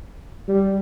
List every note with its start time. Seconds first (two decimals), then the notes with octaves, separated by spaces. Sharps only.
0.48 G3